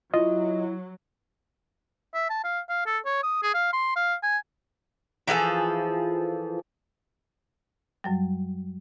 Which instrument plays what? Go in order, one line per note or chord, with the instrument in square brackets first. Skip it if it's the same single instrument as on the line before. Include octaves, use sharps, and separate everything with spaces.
[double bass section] F#3 [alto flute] E4 [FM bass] F4 [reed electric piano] D#5
[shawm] E5
A5
F5
F5
A4
C#5
D#6
G#4
F5
C6
F5
G#5
[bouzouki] E3 F3 G#4 A4
[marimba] F#2 F#3 G3